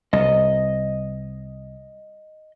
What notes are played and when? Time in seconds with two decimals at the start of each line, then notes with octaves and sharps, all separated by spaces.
0.13 C2 D#5